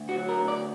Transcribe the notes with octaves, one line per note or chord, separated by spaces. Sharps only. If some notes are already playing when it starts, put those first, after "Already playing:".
Already playing: D2
F#4
F#3
A#4
D2
D5